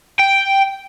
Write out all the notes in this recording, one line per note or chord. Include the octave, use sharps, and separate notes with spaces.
G5